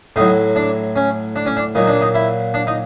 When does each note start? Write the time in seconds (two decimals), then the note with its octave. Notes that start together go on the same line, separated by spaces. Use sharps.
0.16 A2 F#3 D#4
0.56 D4
0.96 C#4
1.36 D4
1.46 C#4
1.57 D4
1.75 A#2 F#3 D#4
1.87 D4
2.01 D#4
2.15 E4
2.54 D4
2.67 D#4